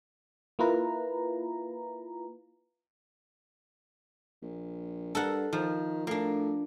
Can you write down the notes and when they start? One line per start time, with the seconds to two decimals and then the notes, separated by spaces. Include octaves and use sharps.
0.59 A#3 E4 F4 B4 A#5
4.42 A#1
5.15 G2 A4 A#4 F#5
5.53 D#3 F3
6.07 A2 A#3 D4